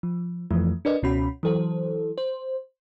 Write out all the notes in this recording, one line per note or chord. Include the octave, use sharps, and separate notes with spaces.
F3
F2 E3 F3 A3
D4 A#4 B4 D5 D#5
C#2 B2 C#4 F#4 B5
E3 F#3 A4 C5
C5